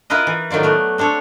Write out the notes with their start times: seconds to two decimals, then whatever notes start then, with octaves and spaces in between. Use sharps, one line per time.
0.10 E4 F4 A#4 B4 D#5
0.27 E3
0.50 A2 D#3 F#3 F4 D5
0.63 A3 B3 F#4
0.98 C4 D4 A4 C#5